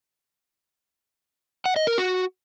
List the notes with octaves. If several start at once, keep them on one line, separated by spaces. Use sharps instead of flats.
F#5
D#5
A#4
F#4